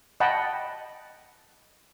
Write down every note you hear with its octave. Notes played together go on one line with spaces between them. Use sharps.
D#5 F#5 G5 A5 B5